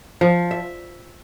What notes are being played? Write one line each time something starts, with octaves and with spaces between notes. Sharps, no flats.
F3
E5